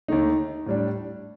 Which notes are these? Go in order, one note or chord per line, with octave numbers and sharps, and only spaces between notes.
D#2 D#3 A3 D#4
A2 G3 D4